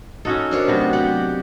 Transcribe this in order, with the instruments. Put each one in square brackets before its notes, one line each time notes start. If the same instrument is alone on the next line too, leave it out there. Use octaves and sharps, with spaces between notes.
[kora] C#4 F#4 A4 [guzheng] D#4 [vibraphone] E6
[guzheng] D4 F4 C#5 [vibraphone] A#4 C5 D6
[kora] C3 B3 F#4 [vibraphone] F#3 A3
[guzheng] G4 [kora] F#5